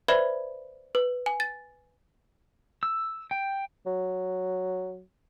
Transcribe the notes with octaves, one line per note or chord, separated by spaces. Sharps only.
B4 C5 D5 E5 B5 G#6
B4
G#5
A6
E6
G5
F#3